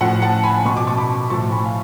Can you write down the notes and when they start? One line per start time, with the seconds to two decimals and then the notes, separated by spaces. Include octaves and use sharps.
0.01 A2 F3 F#5
0.22 F#5 A5
0.44 G#5 B5
0.65 B2 C#6
0.77 D6
0.87 A5 C#6
0.98 B5 D6
1.30 A2 F3 A5 C#6
1.52 G#5 B5
1.66 F5